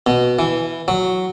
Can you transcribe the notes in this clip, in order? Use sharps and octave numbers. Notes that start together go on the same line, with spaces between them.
B2
E3
F#3